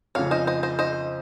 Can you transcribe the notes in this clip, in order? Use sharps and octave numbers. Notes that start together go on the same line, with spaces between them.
F2 C#3 F3 C#5 F5
C5 D#5
C5 D#5
C5 D#5
C5 D#5